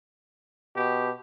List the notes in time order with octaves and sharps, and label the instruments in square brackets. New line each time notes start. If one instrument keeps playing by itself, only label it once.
[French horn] B2 [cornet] G4